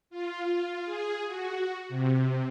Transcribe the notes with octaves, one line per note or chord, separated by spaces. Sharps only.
F4
G#4
F#4
C3